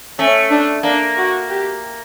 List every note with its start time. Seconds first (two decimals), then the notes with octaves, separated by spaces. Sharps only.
0.19 A3 C#4
0.51 D4
0.83 A#3 D4
1.17 F#4
1.49 G4